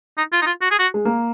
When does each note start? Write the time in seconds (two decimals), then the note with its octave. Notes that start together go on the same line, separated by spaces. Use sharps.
0.17 D#4
0.32 F4
0.42 D#4
0.46 F4
0.61 F#4
0.71 G#4
0.79 F#4
0.94 G#3
1.05 A#3